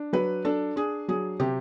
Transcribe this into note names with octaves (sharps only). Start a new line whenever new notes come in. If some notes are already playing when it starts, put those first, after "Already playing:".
Already playing: D4
F#3 B4
D4 A4
D4 G#4
F#3 G#4
C3 G4